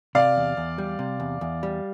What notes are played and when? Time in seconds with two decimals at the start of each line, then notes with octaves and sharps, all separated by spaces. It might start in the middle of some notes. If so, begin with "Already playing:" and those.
0.15 C3 D5 F5
0.37 E2
0.57 E2
0.78 G3
0.99 C3
1.20 E2
1.41 E2
1.63 G3